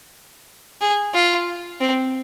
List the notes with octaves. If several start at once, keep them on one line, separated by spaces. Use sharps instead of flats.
G#4
F4
C4